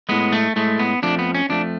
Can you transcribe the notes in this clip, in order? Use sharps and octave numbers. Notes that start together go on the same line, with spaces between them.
A2 G#3 B3
A3
A2 G#3 A3
B3
F2 F3 A3 D4
B3
C#4
F2 F3 A3 D4